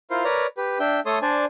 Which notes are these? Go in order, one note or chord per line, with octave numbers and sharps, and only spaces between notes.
E4 F4 A#4 C5 F5
A#4 B4 C#5 D5 A#5
G4 B4
D4 E5 G5 G6
A3 A4 C#5 A5 C6 D#6
D4 C5 D5 G#5 A5